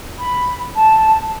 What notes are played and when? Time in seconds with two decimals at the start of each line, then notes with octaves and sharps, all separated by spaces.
0.19 B5
0.75 A5